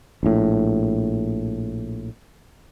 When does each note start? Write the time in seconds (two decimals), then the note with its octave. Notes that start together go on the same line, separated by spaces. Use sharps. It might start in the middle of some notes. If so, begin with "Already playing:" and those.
0.23 A#1 A2